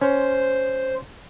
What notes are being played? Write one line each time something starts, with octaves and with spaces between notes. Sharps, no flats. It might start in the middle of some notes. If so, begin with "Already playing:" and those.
C#4 C5